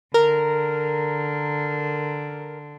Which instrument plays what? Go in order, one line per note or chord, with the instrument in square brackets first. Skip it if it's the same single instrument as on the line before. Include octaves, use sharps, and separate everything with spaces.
[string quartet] D3 [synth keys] A#4